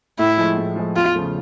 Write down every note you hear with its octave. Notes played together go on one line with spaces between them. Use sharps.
A2 E4
F3 G#3
A2
F3 G#3
E2 F4
C#3 F3 A3